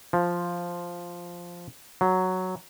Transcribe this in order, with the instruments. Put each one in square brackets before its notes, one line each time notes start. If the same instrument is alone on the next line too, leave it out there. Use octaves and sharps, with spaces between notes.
[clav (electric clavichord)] F3
F#3